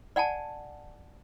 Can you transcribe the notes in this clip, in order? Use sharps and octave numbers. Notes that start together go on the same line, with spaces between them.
D5 F#5 G#5 A5